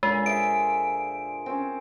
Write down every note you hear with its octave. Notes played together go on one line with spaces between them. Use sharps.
A#2 D3 G#3 G#4
G#4 C5 E5 D7
C4 C#4